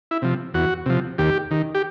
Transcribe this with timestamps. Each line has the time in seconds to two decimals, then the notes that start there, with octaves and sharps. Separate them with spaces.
0.11 E4
0.22 C3 F3
0.54 E2 F#4
0.86 C3 F3
1.18 D#2 G4
1.51 D#3
1.75 G4